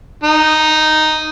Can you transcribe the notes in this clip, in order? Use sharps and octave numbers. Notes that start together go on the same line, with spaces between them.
D#4